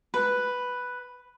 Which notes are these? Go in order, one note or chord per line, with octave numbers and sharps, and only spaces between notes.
B4